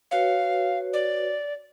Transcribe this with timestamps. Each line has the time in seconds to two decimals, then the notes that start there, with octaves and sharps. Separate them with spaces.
0.11 F#4 B4 C#5 F5
0.93 D5